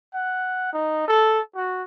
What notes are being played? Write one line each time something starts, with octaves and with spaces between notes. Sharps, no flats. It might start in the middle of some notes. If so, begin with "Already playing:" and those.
F#5
D#4
A4
F#4